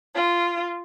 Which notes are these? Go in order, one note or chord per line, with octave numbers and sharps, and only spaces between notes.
F4